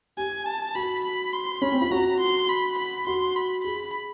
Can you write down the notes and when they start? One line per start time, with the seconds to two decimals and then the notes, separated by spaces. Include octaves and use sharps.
0.17 G4 G#5
0.46 A5
0.75 F#4 B5
1.04 B5
1.33 C6
1.62 C#4 B5
1.72 C4
1.81 F4
1.91 F#4 A#5
2.20 C6
2.49 B5
2.78 B5
3.07 F#4 C6
3.36 B5
3.64 G#4 B5